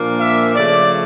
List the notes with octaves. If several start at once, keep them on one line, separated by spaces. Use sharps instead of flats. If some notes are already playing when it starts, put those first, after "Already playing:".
Already playing: A#2 F3 A#3 D4
E5
C#3 F3 A3 D5